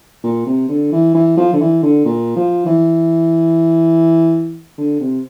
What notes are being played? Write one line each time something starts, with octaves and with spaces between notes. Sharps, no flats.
A#2
C3
D3
E3
E3
F3
D3
E3
D3
A#2
F3
E3
D3
C3